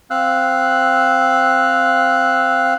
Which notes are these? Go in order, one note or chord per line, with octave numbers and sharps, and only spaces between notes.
C4 F5 E6 F#6